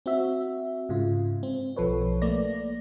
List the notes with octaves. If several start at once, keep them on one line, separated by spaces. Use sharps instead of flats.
C4 F#4 E5
G#2 C#3 F4
C4
B1 F3 A4 B4 C#5
A3 A#3 D5 A#6